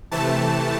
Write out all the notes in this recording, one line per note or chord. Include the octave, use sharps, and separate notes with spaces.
C3 E3 A3 A5